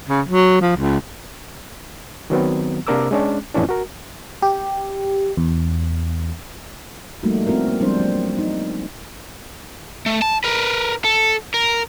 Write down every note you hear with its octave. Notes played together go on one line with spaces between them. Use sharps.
C#3
F#3
F3
C#2
D#3 F#3 B3 C4
C3 A#3 D4 A#4 D6 E6
G#3 C#4 D4
F2 A2 E3 C#4 D4
F#4 A#4
G4
E2
F3 G3 A3 A#3 D#4 F#4
B3 C4 E4 F#4 A#4
A#3
F3 G3 G#3 C4 D4 C5
F#3 A#3
D#4
A3
A5
A#4 B4
A4
A#4